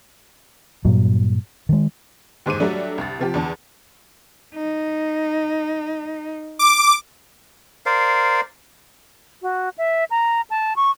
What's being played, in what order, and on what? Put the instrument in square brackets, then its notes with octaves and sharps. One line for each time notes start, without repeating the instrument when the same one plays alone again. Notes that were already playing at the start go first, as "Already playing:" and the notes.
[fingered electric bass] G2 A#2 F#3
D#3 G#3
[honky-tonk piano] D#2 G#2 C5 D6 D#7
F#3 G3 A3 D4
C2 A6
C3 F3 G4
E2 D4 A5
[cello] D#4
[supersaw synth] D6
[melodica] A#4 C5 D5 F5
[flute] F#4
E5
A#5
A5
C#6